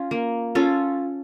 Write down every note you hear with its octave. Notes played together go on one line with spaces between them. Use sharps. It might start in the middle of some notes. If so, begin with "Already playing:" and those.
Already playing: C#4 F4
A#3
C#4 F4 A4